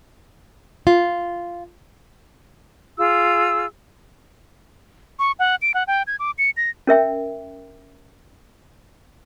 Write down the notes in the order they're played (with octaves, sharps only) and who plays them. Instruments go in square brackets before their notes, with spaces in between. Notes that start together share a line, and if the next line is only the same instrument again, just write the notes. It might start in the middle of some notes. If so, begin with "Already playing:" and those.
[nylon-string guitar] F4
[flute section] F4 G#4 E6
[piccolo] C#6
F#5
D7
F#5
G5
G#6
D6
C#7
A#6
[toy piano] C#4 A#4 E5 G5